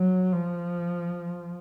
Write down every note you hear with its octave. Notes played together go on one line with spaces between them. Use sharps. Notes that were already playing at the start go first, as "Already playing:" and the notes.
Already playing: F#3
F3